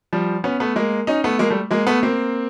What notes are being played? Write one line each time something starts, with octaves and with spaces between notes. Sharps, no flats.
F3 G3
B3 C#4
A3 B3
G#3 A#3
C#4 D#4
A3 B3
G#3 A#3
G3 A3
G#3 A#3
A3 B3
A#3 C4